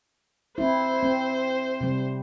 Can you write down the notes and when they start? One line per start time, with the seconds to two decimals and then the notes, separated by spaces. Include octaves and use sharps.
0.58 C4 E4 C5
1.03 C4
1.81 C3 G3